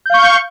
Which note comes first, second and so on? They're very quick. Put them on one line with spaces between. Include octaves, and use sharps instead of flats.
G6 F5 C#6